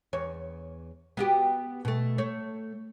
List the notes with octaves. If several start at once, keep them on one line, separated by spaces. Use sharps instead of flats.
E2 C#5
B3 F#4 G4
B2 A3
A3 C#5